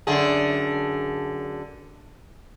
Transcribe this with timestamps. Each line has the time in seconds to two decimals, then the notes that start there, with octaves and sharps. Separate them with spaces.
0.07 F#2 D3 G#4